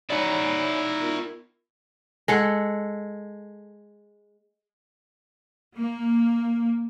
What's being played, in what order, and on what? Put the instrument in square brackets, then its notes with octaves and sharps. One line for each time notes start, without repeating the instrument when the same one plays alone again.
[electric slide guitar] D#4 D5 [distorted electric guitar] E4 F#4 [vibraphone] C#5 G#5 B5
[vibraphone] B3 F4 A#4
[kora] G#3 A4 F#5
[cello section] A#3